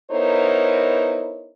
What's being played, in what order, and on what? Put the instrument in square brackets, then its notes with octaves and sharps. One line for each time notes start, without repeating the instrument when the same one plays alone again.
[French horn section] B3 D#4 E4 A#4 C5 C#5